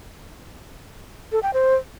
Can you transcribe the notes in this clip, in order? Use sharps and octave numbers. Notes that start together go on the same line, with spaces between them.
A4
G5
C5